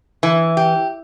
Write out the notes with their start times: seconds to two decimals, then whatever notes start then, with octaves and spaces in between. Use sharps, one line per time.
0.23 E3
0.57 G4